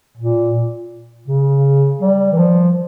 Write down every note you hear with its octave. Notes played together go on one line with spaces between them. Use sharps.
A#2
C#3
G3
E3
F3